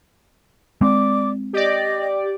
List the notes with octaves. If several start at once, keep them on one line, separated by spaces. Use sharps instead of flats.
G#3 C4 D5 D6
G4 D5 D#5